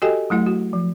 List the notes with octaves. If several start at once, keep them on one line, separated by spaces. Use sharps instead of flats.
F#4 G4 A4 D#5 G5 G#5
F#3 A3 E4 F#5
F#4
F3